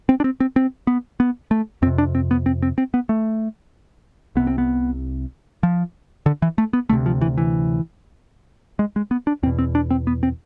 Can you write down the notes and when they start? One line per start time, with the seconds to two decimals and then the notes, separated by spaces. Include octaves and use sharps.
0.09 C4
0.20 D4
0.24 C4
0.40 C4
0.56 C4
0.87 B3
1.20 B3
1.51 A3
1.82 F2 C4
1.87 C3
1.98 D4
2.15 C4
2.31 B3
2.46 C4
2.62 C4
2.78 C4
2.94 B3
3.09 A3
4.36 C2 C3 B3
4.47 C4
4.58 B3
5.63 F3
6.26 D3
6.42 E3
6.58 A3
6.73 B3
6.89 D2 C3 A3
7.06 F3
7.21 E3
7.38 E3
8.79 G#3
8.96 G#3
9.11 B3
9.27 D4
9.43 E2 C4
9.46 B2
9.59 C4
9.75 D4
9.91 C4
10.07 B3
10.23 C4